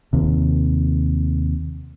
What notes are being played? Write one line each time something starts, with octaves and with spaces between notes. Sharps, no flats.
D#2 C3